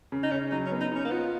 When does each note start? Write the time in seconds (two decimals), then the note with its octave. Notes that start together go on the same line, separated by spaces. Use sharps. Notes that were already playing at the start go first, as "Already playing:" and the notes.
0.12 C#3
0.23 D#4
0.32 C#3 C#4
0.52 F#3 D#4
0.66 C#4
0.71 B3
0.81 D#4
0.91 C#4 D#4
1.05 A#3
1.11 B3 F4